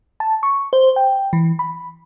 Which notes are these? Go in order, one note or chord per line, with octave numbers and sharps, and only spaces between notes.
A5
C#6
C5
G5
E3
B5